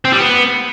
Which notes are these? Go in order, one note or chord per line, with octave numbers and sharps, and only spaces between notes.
C4
G3
B3